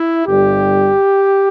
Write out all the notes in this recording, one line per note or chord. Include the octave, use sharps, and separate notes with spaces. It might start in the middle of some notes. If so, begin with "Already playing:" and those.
Already playing: E4
G1 G2 G3 G4